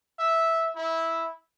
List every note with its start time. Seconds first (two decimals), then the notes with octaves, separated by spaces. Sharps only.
0.19 E5
0.75 E4